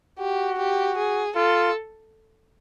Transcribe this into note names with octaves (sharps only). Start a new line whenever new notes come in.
F#4 G4
G4
G#4
F4 A4